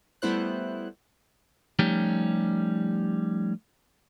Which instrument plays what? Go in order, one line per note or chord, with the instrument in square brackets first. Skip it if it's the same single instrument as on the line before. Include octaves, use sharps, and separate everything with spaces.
[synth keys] G3 A3 B3 E4 C5 F#6
[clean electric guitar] F3 G3 A3 C#4 D#4 G4